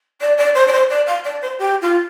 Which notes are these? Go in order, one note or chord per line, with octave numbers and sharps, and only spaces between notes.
D5
D5
C5
D5
C5
D5
F5
D5
C5
G4
F4